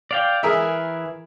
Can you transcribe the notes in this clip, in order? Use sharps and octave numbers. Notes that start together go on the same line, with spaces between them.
D5 F5 G5
E3 G#4 A#4 E5